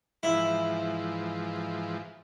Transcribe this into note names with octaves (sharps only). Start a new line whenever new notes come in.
G#2 E3 F3 E4